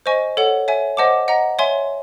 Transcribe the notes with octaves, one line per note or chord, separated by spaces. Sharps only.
C5 D#5 G#5 C#6
A4 C#5 F#5
C#5 E5 G#5
C5 D#5 F#5 A5 D6
D#5 F#5 A#5
C#5 E5 G#5 C6